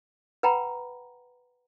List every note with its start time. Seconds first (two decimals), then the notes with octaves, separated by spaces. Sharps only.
0.43 B4 F#5 G5 A#5 B5